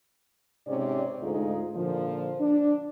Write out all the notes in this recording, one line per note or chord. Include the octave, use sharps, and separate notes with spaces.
G#2 C3 C#4 D5
D2 G#2 G#3 D#4 F4
A#2 D3 F3
D4